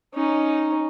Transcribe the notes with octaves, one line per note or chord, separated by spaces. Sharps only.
C#4 D#4